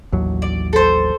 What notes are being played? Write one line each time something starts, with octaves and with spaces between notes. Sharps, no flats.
A1 D#2 F#3
D5
A4 C5